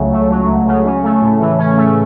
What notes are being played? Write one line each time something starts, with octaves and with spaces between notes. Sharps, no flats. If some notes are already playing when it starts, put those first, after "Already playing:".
Already playing: C#2 C#3 F#3 A3
A3
F#3
C#2
C#3
C#4
A3
A2
E3
C#4
A3